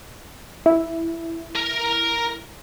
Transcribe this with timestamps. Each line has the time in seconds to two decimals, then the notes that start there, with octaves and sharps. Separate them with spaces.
0.66 E4
1.56 A#4 A#5